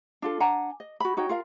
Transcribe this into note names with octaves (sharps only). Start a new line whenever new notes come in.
D4 F4 A4
D4 F#5 G#5 A#5
D#5
F#4 B5
D#4 F#4 C#5 G5
F4 A#4 F5